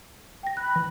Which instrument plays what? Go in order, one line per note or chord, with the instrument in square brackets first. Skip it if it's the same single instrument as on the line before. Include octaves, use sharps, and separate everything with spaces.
[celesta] G5 A#6
[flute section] B5 [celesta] F#6
[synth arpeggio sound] E3